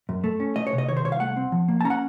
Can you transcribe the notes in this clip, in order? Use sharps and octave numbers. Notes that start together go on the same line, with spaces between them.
F#2
A3
C#4
A3 D#5
C#5
C3
D#5
D#3 C#5
C5
C2 C#5
F5
A3 F#5
C4
F3
A#3
A5
C#4 A#5
F#5